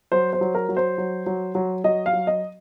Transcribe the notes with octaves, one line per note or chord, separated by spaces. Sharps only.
F#3 C5
C5
F#3
A#4
F#3
C5
F#3
F#3
F#3
F#3 D#5
F5
F#3
D#5